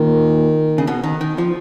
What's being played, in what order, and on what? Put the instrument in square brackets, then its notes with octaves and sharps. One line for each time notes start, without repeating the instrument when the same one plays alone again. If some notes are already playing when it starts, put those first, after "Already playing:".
Already playing: [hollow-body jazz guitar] A#2 [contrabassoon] D#3
[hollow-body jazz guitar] C#3
B2
D#3
D#3
F3